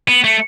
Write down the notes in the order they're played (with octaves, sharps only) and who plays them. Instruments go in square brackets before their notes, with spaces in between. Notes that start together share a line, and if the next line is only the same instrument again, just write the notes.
[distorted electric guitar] B3
A3